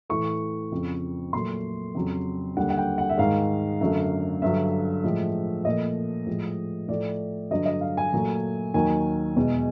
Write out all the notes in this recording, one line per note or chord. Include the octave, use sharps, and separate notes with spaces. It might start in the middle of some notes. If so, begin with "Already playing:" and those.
A2 E3 A3 C#6
F2 C#3 F3
A#2 F#3 A3 C6
F2 C#3 F#3
D#2 D3 G3 F#5
F#5
G5
F#5
E5
G#2 D#3 G#3 F5
F#2 D3 F#3 A3
G2 D3 F#3 E5
A2 F3 G#3
A#2 F3 A3 D#5
A2 F3 G#3
A2 F3 A3 D5
G2 D3 F#3 D#5
D#5
F5
G#5
A#2 F#3 A3
D#2 D#3 F#3 G#5
E2 B2 G#3